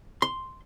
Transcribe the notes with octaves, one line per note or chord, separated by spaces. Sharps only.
C6